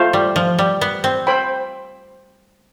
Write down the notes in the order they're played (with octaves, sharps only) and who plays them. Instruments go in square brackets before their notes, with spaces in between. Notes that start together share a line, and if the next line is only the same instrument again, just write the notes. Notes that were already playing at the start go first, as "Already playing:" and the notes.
Already playing: [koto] A3 [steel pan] F4 C5 F5
[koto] G3
F3
G3
B3
C4
[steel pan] C5 G5 B5